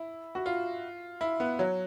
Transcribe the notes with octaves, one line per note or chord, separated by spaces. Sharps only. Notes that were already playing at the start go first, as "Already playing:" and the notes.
Already playing: E4
F#4
F4
E4
B3
F#3